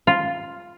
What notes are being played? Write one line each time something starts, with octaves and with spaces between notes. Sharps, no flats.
F4